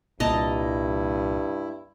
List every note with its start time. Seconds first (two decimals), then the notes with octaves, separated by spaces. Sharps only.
0.20 C2 G2 A#2 E4 D#5 A5 A#5